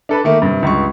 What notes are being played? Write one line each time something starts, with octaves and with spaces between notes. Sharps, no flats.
D4 A4 B4
D#3 A3 A#3
G2 C3
C#2 G2 C#6